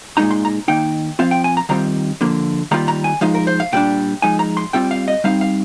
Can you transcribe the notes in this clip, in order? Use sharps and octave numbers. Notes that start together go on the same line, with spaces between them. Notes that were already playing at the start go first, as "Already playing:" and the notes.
A#2 G#3 D#4 A#5
C6
A#5
D#3 A#3 D#4 G5
F3 C4 F4 F5
G5
G#5
A#5
D#3 G3 C4 F4 A#5
D3 F3 A#3
D#3 G3 A#3 F4 A#5
A#5
G#5
F3 G#3 D#4 F5
A#4
C5
F5
A#2 G3 D4 G5
F3 G#3 D#4 G#5
A#5
C6
G3 C4 F4 G5
F5
D#5
G3 C4 D#4 F5
F5